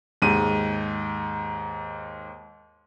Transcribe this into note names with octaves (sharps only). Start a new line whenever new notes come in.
D#2 G#2 D#7